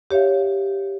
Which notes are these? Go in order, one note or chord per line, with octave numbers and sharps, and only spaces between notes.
G4 C#5 E5 F5